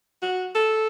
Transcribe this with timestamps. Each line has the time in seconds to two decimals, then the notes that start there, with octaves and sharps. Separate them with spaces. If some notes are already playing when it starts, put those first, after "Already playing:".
0.22 F#4
0.55 A4